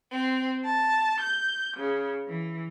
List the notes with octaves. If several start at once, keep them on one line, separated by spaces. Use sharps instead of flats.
C4
A5
G6
C#3
E3